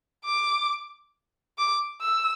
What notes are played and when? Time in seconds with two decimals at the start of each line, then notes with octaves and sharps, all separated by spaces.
0.25 D6
1.58 D6
2.01 E6